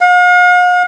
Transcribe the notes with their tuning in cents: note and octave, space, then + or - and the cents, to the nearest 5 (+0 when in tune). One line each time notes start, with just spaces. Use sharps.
F5 +45